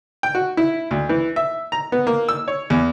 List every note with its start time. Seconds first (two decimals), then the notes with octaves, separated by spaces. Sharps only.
0.23 G5
0.35 F#4
0.57 E4
0.91 D2
1.09 E3
1.36 E5
1.72 A#5
1.92 B3
2.07 A#3
2.29 E6
2.48 C#5
2.70 E2